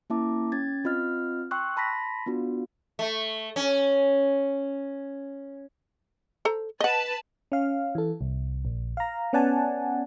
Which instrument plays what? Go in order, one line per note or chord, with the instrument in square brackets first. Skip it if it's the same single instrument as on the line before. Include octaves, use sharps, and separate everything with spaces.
[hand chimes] A#3 C#4 E4 E5 A5 D6
C#4 G#6 A6
C4 F4 D#5 F6
G5 C6 C#6 E6 F#6
A5 B5 C6 A#6 B6
B3 D4 F4 F#4
[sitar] A3
C#4
[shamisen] A4 C5 A#5
[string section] B4 A5 [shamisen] D#5 F#5
[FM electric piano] C#4 F5
E3 A4
C2
A#1
F5 A#5
B3 C#4 D5 F#5 G#5 A5